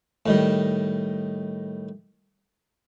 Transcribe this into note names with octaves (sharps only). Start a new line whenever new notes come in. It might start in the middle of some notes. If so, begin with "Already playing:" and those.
A2 D#3 G3